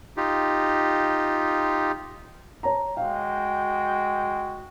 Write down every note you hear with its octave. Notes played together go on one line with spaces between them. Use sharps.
D#4 F4 G4
C#5 A5 A#5
G#3 F#4 F5 G5